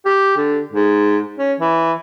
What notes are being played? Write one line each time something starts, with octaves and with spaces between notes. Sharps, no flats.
G4
D3
G#2
C#4
E3